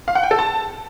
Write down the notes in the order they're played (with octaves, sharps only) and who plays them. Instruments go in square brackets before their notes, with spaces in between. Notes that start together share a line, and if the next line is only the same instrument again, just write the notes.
[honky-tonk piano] F5
F#5
G5
A4
A5